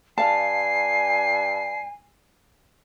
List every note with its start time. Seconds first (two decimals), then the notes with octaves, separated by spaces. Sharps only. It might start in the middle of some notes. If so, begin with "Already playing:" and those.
0.18 G2 F5 G#5 A5 C7